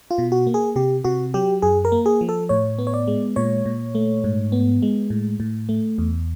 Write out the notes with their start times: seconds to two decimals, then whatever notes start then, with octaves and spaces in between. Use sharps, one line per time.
0.11 F4
0.18 B2
0.32 F#4
0.47 A#3
0.54 G#4
0.76 C3 G4
1.04 C3 F#4
1.34 F#3 G4
1.62 F#2 G#4
1.85 A#4
1.92 A#3
2.06 G#4
2.21 F3
2.29 A4
2.49 A2 C#5
2.79 B3
2.87 C#5
2.94 D5
3.08 G#3
3.36 A#2 C#5
3.66 A#2
3.95 A3
4.24 G#2
4.52 B3
4.82 G#3
5.10 A2
5.40 A2
5.69 A3
5.98 E2